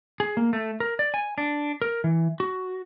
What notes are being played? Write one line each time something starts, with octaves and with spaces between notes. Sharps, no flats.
G#4
A#3
A3
A#4
D5
G#5
D4
A#4
E3
F#4